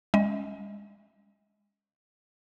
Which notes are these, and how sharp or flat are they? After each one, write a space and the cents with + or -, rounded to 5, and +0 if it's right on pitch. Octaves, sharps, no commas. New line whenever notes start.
G#3 -35 C#4 +0 D#5 +40